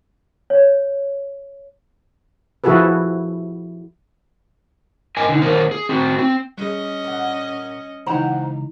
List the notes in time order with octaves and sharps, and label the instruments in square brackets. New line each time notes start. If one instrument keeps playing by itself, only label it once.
[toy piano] C#5
[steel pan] F3 E4 F#4 G#4 A4 B4
[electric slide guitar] A#4 D#5 G5 G#5
D3 D#4
D#3 B3 A#4 C5
G#4
C4 F#4
C4
[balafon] G3 G#4 [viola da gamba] C#4 D#5
[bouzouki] A#2 F#5
[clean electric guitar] C#2 A#5 [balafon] E3 D#4 E4 [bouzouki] C5 F#5 G5